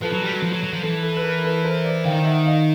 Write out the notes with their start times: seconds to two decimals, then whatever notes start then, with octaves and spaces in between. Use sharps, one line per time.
0.02 F3 A4 B4
0.13 F#3
0.23 G3
0.32 F#3
0.43 F3
0.53 F#3
0.63 F#3
0.73 F3
0.83 E3 A4
1.03 A4
1.16 B4
1.23 A#4
1.44 A4 B4
1.64 A#4 C5
1.84 C5 D5
2.04 D#3 F5 G5
2.25 E5 F#5
2.45 D#5 F5